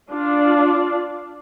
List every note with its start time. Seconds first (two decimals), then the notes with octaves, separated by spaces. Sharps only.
0.11 D4 F4 D5